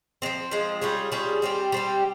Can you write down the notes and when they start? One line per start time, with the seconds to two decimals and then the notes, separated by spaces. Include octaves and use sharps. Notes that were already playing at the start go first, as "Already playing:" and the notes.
0.22 G#3 C4
0.26 F3
0.51 F3 G#3 C4
0.81 G3 C#4 F4 G#4
1.12 G3 C#4 F4 G#4
1.42 G3 C4 G4
1.72 G3 C4 G4